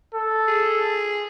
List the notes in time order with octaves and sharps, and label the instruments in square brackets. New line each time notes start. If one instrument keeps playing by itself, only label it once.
[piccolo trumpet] A4
[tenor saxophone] G#4